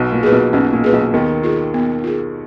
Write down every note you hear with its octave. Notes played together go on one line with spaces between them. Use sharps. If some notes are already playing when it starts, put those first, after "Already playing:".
Already playing: B1 B2
A#2
G#4 B4
B1 B2
B1 B2 C#4
A#2
G#4 B4
B1 B2
D#2 D#3 B3
F4 G#4
B3
F4 G#4